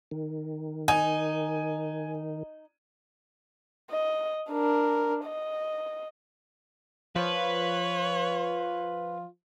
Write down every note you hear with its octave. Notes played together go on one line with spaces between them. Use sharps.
D#3
D#4 G#5
D#5
D4 A#4
D#5
F3 F4 B4 C#5